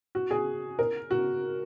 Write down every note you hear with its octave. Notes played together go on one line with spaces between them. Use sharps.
F#4
G#4
A#4
F#4